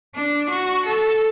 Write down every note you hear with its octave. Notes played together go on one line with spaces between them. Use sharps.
D4
F#4
A4